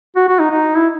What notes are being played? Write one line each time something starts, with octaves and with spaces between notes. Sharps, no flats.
F#4
F#4
D#4
D#4
E4